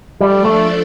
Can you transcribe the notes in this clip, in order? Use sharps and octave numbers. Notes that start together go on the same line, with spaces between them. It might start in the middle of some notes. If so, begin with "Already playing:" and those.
F3 G3 A3 D4 A4 D5
A3